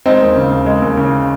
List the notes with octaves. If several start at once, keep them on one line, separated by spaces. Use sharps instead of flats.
G#3 C4 D#4
D#2
C#3
D#2
G#3
D#2
C#3